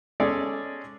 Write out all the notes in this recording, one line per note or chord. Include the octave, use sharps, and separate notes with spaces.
G#3 C#4 G#4 A4 C#5 D5